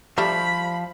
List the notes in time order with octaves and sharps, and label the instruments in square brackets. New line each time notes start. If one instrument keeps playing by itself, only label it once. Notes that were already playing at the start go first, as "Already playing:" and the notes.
[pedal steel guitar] F3 [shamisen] G3 A3 D4 [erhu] B5